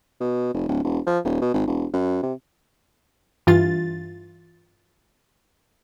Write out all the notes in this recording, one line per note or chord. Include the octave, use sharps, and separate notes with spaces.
B2
F1
D1
E1
F3
D#1
B2
G#1
E1
F#2
C3
G2 E3 F4 A6